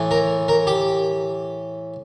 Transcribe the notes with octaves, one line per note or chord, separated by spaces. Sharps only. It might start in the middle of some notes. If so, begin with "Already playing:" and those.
Already playing: A2 E3
A#4
A#4
G4